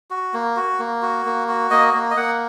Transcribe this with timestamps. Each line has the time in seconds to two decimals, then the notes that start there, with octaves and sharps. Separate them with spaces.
0.11 F#4
0.34 A#3
0.57 F#4
0.79 A#3
1.02 F#4
1.25 A#3
1.48 F#4
1.71 A#3 D#5
1.94 A#3
2.11 D#5
2.17 A#3 F#5